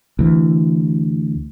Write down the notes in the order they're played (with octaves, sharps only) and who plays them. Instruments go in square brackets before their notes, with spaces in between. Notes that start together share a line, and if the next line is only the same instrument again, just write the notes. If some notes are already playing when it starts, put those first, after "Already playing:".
[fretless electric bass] D2 E3